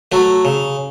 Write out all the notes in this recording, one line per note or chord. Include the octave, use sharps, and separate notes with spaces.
F#3 A3
C#3